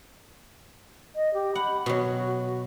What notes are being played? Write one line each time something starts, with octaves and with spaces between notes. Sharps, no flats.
D#5
G4
F#5 B5
B2 F#3 F#4